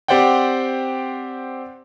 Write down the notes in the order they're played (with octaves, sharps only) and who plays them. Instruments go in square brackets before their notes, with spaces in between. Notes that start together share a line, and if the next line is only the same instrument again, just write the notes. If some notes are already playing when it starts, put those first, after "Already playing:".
[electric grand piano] C4 G4 C5 D5 F#5 G5